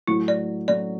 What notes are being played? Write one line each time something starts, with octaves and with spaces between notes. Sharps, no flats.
A2 F#3 A3 E4
D5
A2 F#3 A3 D5